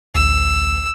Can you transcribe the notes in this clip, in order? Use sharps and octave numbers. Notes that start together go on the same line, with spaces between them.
A1 D2 E6